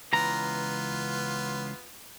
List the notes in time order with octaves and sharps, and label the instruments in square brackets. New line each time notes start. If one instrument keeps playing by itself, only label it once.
[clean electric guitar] C#2 E3 A#5 [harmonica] B3 F4